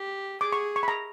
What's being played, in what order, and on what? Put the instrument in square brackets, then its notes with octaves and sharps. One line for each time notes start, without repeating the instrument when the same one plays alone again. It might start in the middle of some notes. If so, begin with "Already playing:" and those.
Already playing: [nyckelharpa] G4
[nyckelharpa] G#4 [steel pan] D6
[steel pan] C#6
C#6
B5
A#5